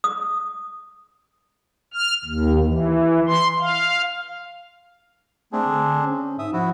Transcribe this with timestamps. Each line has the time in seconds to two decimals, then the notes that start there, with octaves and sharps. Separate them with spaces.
0.04 D#6
1.94 F6
2.25 D#2
2.66 E3
3.28 C6
3.60 F5
5.52 A3 C4 D4 G#4
5.66 D3
6.03 C#4
6.39 G#2 E5 D#6
6.53 F3 E4 F#4